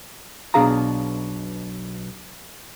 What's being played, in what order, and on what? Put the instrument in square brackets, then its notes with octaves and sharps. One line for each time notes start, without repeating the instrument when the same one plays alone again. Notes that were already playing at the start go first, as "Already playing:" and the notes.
[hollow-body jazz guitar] B1 B2 D4 G#4 F5 A#5